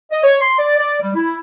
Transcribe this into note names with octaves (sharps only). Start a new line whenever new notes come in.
D#5
C#5
C6
D5
D5
G3
E4